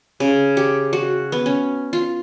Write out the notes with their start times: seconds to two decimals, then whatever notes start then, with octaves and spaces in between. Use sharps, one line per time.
0.20 C#3
0.57 G4
0.93 F#4
1.32 B3
1.46 C#4
1.93 F4